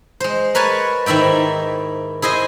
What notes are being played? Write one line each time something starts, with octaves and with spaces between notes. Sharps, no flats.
G#3 C5
A#4 B4 C#5 G#5 A5
G#2 D#3 E4 E5 G5
E4 G#4 C5 D#5